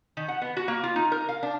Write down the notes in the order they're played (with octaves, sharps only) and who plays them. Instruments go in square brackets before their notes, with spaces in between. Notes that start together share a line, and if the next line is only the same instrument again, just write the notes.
[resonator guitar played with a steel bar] D#3
F#5
B3
F#4
A#3
F4
D#4
A#4
F5
D4